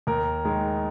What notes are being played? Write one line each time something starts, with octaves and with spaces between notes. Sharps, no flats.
D#2 A#4
D#3 G#3